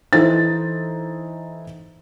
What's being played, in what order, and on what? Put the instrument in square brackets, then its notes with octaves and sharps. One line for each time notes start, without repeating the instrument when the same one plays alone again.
[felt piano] E3 D#4 E4 A4 C5 A6